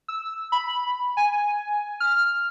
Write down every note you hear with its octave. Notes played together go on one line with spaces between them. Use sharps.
E6
B5
G#5
F6